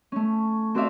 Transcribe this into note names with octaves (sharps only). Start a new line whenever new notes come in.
A3 C#4
C4 F#4 C5 D5 E5 F5